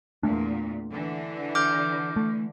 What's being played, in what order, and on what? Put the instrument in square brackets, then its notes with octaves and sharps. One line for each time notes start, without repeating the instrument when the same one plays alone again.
[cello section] E2 A#2 [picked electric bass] A3 D4
[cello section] D3 E3
[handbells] D6 F6 G6
[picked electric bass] A3